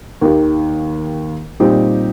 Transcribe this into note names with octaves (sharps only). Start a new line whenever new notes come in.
D#2 D#3 A#3 G4
A#2 G3 C4 D#4 G4